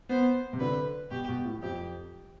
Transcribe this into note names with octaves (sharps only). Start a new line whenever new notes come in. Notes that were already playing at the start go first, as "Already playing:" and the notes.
B3 C5
C3
D3 B4
B2 G4
B2
A2
F2 G4